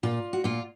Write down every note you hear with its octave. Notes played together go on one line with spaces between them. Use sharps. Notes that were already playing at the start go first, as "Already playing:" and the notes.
A#2 F4
F#4
A#2 F4